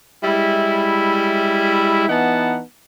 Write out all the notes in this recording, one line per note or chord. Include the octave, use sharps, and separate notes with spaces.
G3 G#3 E4
E3 B3 D#4 F#5 A5